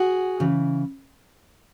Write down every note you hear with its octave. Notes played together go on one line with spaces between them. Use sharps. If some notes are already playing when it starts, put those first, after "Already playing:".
Already playing: F#4 G#4
C#3 E3